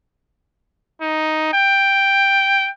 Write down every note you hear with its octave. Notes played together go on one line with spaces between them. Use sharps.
D#4
G5